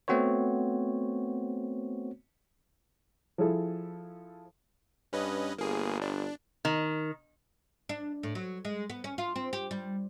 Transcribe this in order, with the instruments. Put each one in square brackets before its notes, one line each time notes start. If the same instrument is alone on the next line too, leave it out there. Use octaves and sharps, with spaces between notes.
[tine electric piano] A3 B3 C4 F#4 C5 C#5
[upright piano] F3 E4 G#4 A4
[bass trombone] G2 [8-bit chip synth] C#4 B4 D#5
[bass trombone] G1 [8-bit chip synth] A#3 G#4
[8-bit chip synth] D4
[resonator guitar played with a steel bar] D#3
[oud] D4
A2
F#3
G#3
B3
C#4
F4
C4
G4
G3